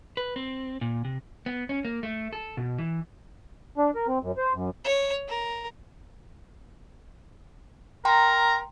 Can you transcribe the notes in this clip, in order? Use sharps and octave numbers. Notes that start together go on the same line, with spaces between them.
B4
C4
A#2
C3
B3
C#4
A#3
A3
A4
B2
E3
D4
A#4
C4
F#2
C5
F#2
C#5
A#4
A#4 G5 A#5 C6